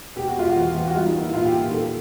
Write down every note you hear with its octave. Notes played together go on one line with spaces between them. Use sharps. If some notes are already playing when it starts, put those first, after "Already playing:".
B2 G4
F#4
G#3 F4
F#4
E2
E2
F#4
G3 F4
D#4
A#3
E4
A#2 F4
G4
A#2
D#3 A4